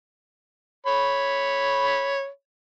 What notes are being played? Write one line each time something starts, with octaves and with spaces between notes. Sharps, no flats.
C#5 B5